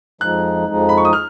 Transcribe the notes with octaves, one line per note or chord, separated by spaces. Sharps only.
F2 F3 G#3 D#4 F#6
F2 F3 G#3 D#4
B5
C#6
D#6
F6